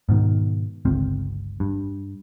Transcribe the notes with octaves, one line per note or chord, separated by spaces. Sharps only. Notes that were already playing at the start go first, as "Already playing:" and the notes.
G#2 B2 D#3
G1 C#2 C4
G2